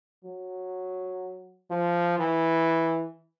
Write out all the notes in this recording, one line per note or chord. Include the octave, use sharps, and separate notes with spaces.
F#3
F3
E3